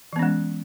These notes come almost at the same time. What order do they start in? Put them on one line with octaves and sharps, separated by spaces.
E3 B3 C#4 G#3